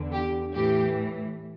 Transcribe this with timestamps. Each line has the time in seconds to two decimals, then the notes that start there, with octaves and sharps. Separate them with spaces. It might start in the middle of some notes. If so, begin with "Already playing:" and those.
Already playing: E2 D3
0.13 G4
0.55 A2 E3 G4